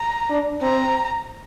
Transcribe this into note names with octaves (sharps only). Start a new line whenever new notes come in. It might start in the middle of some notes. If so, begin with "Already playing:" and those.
Already playing: A#5
D4
C4 A#5